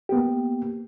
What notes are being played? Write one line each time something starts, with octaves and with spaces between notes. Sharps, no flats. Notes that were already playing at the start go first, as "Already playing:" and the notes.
A#3 B3 G4